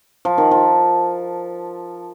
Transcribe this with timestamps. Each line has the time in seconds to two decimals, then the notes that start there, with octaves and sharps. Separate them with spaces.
0.25 F3
0.38 D#3
0.51 F3